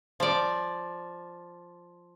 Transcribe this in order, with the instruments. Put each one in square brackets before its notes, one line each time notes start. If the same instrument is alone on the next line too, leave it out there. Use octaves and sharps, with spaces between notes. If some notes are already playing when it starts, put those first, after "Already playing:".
[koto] F3 D5